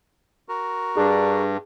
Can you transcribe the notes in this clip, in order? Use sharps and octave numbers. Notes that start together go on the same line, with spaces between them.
F#4 A#4
G2 D4 G#4